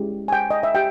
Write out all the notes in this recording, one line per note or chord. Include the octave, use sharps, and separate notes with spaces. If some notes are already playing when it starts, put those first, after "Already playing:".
Already playing: G#3 C#4 E4 G4
G#5
G5
D#5
E5
G4 G5